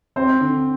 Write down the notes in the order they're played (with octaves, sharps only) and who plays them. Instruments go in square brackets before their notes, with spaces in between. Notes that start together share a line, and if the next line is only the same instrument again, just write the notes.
[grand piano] C4 [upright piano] C5
[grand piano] D3